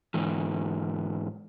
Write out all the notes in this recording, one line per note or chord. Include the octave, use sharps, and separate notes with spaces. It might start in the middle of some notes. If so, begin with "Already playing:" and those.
G#2 D3 E3